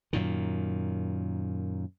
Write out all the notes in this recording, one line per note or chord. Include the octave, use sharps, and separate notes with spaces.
F#2 A#2 D#3